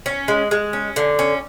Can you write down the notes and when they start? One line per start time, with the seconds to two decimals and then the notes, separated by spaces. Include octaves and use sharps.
0.06 C#4
0.28 G#3
0.51 G#3
0.73 C#4
0.96 D3
1.19 C#4